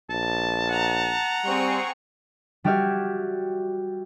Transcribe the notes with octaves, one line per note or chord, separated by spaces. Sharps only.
A#1 A5
F#5 A#5
G3 C4 G#4 C#6
G3 F#4 G4 E5 F6 G#6